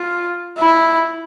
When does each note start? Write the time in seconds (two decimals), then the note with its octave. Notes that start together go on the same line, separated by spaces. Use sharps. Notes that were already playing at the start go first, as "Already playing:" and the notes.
Already playing: F4
0.58 E4